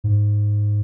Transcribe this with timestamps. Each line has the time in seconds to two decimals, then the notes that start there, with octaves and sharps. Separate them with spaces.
0.04 G#2